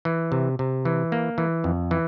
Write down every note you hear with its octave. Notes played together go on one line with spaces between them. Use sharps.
E3
C3
C3
E3
A#3
E3
F2
E3